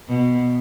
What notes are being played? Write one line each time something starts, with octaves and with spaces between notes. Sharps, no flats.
B2